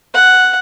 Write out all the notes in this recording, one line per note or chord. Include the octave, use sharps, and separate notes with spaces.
F#5